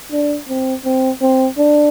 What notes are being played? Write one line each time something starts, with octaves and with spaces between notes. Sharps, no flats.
D4
C4
C4
C4
D4